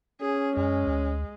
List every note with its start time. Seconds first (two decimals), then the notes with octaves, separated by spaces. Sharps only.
0.21 C#4 G#4
0.57 F#2 G#3
0.87 D2